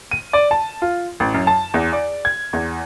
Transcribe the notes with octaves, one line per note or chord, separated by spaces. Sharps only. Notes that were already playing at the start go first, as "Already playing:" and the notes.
D#7
D5
A5
F4
A1
F#2
A5
E2
D5
G#6
E2